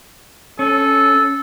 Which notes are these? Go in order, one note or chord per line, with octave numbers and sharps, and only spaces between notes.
C#4 A4